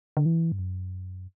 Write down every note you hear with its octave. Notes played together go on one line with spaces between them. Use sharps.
D3
E3
G2
F#2